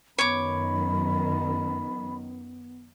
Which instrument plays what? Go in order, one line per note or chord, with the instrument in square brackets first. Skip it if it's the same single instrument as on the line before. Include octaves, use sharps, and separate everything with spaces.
[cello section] F#2 D#3 [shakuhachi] B3 [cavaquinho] C#5 D6 [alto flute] B5